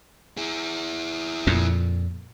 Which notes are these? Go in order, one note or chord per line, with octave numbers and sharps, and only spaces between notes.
E4 G#4
F2 A#2